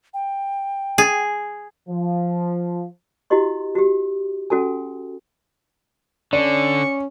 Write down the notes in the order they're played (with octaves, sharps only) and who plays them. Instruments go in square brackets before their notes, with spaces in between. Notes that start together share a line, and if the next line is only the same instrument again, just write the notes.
[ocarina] G5
[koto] G#4
[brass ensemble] F3
[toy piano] E4 F#4 G4 D#5 C6
F#4 G4
C#4 F#4 A4 G#5
[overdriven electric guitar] D3 [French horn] C#4 [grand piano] D5 [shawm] C#6